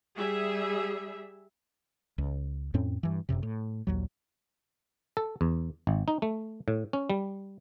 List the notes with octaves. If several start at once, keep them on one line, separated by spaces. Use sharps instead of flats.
G3 G#4 E5
C#2
F2 A2 C4 C#4
G2 E3
F#1 C2 F#2 C3
A2
A#1 D#2 F#3
A4
E2
G#1
D#4
A3
A2
C#4
G3